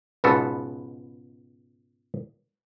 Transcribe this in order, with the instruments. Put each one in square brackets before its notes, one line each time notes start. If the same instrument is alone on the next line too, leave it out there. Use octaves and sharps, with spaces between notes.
[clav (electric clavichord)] C#2 G#2 B2 B3 A4